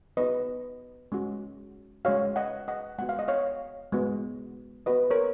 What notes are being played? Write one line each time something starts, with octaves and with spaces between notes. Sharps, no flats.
B3 D#4 F#4 B4 D#5
G#3 C#4 F#4
G#3 C#4 F#4 C#5 F5
D#5 F#5
D#5 F#5
G#3 B3 F#4 F#5
F5
D#5
C#5 F5
G#3 B3 F#4
B3 F#4 B4 D#5
A#4 C#5